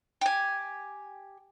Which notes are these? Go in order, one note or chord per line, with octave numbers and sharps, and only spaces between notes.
G4 G#5